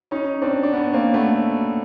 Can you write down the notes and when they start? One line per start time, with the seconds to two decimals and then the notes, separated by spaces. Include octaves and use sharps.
0.11 C#4 D#4
0.42 C4 D4
0.63 D4
0.73 B3 C#4
0.93 A#3 C4
1.14 A3 B3